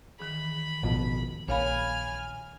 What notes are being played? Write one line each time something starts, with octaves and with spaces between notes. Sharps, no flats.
D#3 E3 G#4 B5
A1 F2 B2
A#1 C#5 F5 G#5 B5 F6